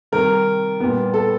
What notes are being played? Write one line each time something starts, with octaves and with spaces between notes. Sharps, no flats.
C3 D#3 G3 A#4
A#2 G3 B3
A4